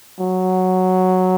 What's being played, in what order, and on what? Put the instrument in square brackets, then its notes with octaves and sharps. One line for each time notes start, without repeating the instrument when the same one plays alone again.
[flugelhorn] F#3